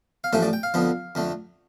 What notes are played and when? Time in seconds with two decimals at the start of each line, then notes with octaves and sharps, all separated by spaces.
0.24 F5
0.33 A1 A2 F3 A3 E5
0.43 D5
0.53 G5
0.63 F5
0.74 F2 D3 F3 B3
1.15 F2 D3 A3